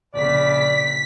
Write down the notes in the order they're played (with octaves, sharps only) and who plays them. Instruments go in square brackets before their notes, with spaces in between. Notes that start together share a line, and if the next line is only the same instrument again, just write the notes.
[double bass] A#1 C#3 [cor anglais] D5 [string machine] B6